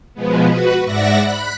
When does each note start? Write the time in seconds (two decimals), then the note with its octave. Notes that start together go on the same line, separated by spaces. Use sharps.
0.14 B2 F3 G#3 B3
0.47 F#4 B4
0.83 G#2 D5 E5 F#5 A#6
1.20 B5 F#6